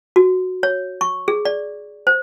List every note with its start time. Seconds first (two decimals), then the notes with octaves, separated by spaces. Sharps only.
0.16 F#4
0.63 C#5
1.01 C#6
1.28 G#4
1.45 D5
2.07 C5